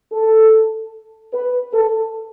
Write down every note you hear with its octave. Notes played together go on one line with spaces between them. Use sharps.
A4
B4
A4